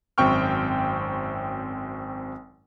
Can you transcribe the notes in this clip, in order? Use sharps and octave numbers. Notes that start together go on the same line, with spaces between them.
G#1 F#2 C4 G5 C#6 F6